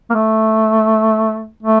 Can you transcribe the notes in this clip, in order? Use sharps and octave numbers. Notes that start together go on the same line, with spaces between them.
A#3
A3
A3